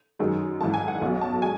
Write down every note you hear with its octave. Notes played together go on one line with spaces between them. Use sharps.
F#2 D#3 G#3
G#1 G#2 E3 A5
G#5
F#5
B1 B2 F#3
A5
G#3 G#5